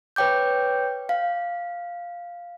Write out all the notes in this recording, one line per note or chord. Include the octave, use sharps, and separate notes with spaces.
B4 C#5 G5 D6 G6
F5